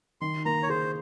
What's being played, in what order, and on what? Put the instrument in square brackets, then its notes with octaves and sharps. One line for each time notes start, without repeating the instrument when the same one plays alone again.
[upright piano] D#3 [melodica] C6
[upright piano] A#3 [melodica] A#5
[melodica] C#5
[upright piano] G#4 [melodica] C5